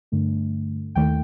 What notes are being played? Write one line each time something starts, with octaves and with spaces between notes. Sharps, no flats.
G2 D3 A3
D#2 D#3 A3 G5